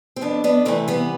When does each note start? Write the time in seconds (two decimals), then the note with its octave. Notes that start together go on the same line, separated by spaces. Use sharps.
0.16 C4
0.21 F2 B3 D4
0.44 B3 D4
0.65 C3 E3 A3 C4
0.88 G3 B3